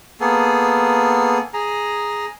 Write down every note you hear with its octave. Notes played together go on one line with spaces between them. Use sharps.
A#3 B3 G#4 A4
G#4 A#5